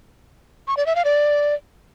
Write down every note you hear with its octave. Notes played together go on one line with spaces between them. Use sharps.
C#6
D5
E5
F5
D5